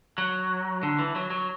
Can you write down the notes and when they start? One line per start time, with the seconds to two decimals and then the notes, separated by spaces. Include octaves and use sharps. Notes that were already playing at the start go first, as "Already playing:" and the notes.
0.18 F#3
0.83 D3
0.99 E3
1.15 F#3
1.30 F#3